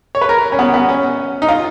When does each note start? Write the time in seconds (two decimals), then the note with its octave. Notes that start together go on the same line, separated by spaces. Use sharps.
0.15 C#5
0.21 B4
0.29 A#4
0.52 C#4
0.59 B3
0.74 B3
0.89 C#4
1.42 D#4
1.49 F4